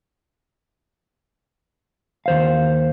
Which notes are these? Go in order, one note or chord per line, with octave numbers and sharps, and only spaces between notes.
D#2 C5 F5